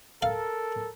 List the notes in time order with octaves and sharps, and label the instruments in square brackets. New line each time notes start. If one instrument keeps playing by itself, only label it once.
[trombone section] A4 A#4 [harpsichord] F5